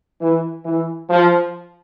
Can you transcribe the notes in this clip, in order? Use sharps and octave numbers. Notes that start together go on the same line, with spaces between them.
E3
E3
F3